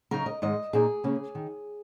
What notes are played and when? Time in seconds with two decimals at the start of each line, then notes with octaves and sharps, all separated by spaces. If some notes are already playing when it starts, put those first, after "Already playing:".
0.11 C#3 F#3 D#4 A#4
0.26 D#5
0.42 G#2 D#3 G#3 D#5
0.73 A#2 A#3 D#4 G#4
1.04 C#3 A#3 C#4
1.35 D#3